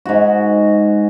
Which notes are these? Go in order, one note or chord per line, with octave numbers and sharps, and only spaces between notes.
G#2 F#4